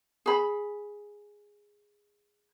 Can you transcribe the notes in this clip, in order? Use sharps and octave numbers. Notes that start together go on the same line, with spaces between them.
G#4 B5